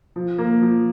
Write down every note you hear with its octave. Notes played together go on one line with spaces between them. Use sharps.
F3
A#3
F3